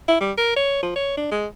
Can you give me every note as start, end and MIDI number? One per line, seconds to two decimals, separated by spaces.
0.08 0.20 64
0.20 0.32 55
0.38 0.56 70
0.56 0.81 73
0.83 0.93 53
0.95 1.12 73
1.17 1.27 62
1.31 1.46 56